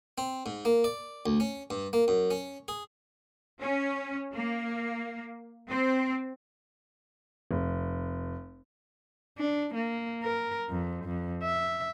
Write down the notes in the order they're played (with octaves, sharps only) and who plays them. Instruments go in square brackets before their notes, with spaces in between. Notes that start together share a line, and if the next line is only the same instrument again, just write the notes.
[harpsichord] C4
G#2
A#3
D5
D2
C#4
G2
A#3
F#2
C#4
G#4
[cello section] C#4
A#3
C4
[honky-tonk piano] F1
[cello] D4
A#3
A#4
F2
F2
E5